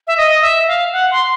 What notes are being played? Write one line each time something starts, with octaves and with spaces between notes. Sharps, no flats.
E5
D#5
E5
F5
F#5
C6